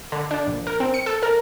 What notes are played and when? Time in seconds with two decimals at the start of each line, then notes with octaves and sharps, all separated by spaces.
0.12 D3
0.31 D4
0.47 A#1
0.67 A#4
0.80 C4
0.94 C#7
1.06 A4
1.23 A#4